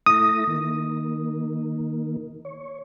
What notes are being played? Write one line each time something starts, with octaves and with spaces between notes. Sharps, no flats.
A3 E4 D#6 A#6
D#3 A#3
C#5